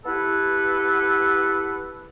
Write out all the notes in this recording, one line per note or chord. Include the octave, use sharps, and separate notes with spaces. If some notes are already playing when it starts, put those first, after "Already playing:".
B3 E4 G4 A4 B4